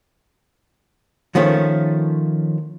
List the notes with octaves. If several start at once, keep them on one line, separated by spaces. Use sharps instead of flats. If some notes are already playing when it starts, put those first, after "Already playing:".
D#3 F3 A3 C#4